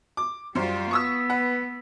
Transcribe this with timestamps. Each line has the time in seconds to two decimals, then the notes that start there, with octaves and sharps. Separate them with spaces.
0.17 D6
0.55 F#2 G3 F4 C5
0.91 B3 C#6 D#6 E6
1.30 B4 F#5